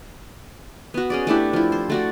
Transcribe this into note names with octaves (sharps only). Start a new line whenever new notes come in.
B3 F#4
C#4 G#4 D5
A3 D4 E4 G4
F3 E4
C5
A3 F#4 D5